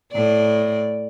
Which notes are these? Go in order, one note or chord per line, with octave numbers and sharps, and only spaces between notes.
A2 D5